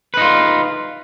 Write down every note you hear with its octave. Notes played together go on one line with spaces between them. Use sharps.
D#4 F4 B4